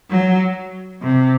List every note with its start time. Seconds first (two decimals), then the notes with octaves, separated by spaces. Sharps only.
0.10 F#3
1.02 C3